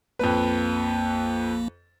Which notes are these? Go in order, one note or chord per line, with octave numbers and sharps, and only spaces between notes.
A#1 F2 A#3 B4